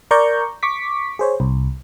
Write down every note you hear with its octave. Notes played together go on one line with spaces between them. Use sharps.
A#4 D5 A#5 C#6 G6
C#6 D6 B6
G#4 C5 C#5
C2